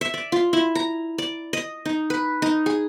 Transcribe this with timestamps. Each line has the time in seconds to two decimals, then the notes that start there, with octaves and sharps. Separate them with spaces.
0.01 E5
0.14 D5
0.32 F4
0.53 E4
0.75 A#5
1.18 D5
1.53 D#5
1.85 D#4
2.10 B4
2.42 D#4
2.66 G#4